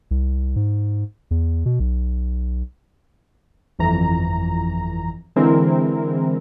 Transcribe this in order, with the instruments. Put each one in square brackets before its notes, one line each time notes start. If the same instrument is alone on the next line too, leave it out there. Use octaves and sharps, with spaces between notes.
[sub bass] C2
G#2
E2
B2
B1
[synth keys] G1 F2 E3 A#5
D3 E3 G#3 C4 E4 A#4